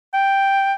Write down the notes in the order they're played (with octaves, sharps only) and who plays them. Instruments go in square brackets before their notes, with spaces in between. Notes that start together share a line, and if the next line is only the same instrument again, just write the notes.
[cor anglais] G5